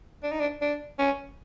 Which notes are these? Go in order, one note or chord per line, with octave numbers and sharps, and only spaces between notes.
D4
D#4
D4
D4
C#4